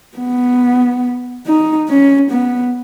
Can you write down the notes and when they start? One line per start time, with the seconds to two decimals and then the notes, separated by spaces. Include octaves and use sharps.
0.18 B3
1.47 D#4
1.89 C#4
2.31 B3